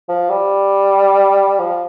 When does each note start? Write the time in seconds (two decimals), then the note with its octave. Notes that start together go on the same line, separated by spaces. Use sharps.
0.09 F3
0.30 G3
1.59 F3